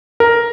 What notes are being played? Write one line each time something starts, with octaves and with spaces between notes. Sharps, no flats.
A#4